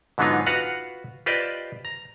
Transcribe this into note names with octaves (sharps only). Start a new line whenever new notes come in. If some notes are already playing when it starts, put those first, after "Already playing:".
G#2 D3 F#3 B3 D#4 F4
F4 F#4 B4 F5 F#5
F4 G4 B4 C5 D5 D#5
A#5